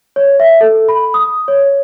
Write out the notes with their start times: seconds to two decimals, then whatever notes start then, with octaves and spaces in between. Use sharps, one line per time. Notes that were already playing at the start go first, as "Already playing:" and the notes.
0.16 C#5
0.40 E5
0.61 A4
0.89 B5
1.14 D#6
1.48 C#5